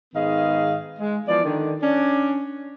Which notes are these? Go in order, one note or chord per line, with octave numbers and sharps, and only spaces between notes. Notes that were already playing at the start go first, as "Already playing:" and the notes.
G#2 D#3 B3 G#4 D#5 F5
G#3
E3 F3 B3 D5
D3 D#3
C#4 D4